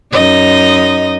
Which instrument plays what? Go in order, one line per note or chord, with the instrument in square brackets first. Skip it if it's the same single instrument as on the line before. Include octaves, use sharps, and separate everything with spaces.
[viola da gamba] F#2 D#4 D#5